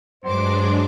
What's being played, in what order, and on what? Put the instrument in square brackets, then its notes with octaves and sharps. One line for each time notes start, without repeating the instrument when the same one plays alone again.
[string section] G2 D6 [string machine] F#3 G#3 D4 [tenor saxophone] C5